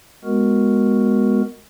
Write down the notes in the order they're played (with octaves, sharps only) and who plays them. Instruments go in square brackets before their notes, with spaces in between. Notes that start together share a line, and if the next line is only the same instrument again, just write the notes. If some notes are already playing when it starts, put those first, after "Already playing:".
[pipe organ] G#3 B3 F#4 A#4